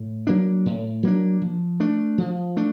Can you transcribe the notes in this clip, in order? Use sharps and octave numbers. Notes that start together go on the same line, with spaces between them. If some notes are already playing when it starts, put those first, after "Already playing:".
Already playing: A2
F#3 A#3 D4
A2
F#3 A#3 D4
F3
A3 D4
F3
A3 D4